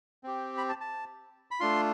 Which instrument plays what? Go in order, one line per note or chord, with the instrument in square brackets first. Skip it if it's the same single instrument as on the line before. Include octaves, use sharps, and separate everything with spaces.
[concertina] C4 G4
B5
A5
A5
B5
A3 D4 F4 C6